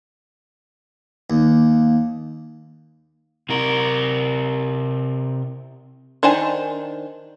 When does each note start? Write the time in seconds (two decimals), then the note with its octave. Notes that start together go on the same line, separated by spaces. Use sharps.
1.30 D#2 A#3
3.49 C3 A#4
6.23 D#3 D4 C5 G#5